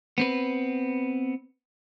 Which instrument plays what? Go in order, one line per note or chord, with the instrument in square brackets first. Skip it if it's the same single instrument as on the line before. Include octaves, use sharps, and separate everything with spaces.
[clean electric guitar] B3 C4 B4